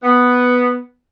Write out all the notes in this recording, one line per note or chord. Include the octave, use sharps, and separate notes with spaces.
B3